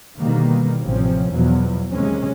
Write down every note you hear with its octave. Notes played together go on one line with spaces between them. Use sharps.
B2 D3 D#3 G3 A#3
A1 C3 F3 C4 C#4
E2 B2 F3 F#3
D#2 C3 G#3 C#4